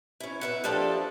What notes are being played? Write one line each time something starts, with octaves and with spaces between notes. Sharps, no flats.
C#4 E4
B4 E5 F#5
F3 A#3 D4 G4 A4 A5